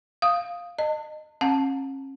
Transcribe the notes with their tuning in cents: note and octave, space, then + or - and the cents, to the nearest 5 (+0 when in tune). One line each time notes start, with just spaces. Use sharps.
F5 +5 D#6 +0
D#5 -20 A5 +40
C#4 -40 F#5 -40 A5 +0